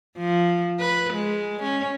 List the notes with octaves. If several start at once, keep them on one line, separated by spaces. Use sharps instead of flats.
F3
B4
G#3
C#4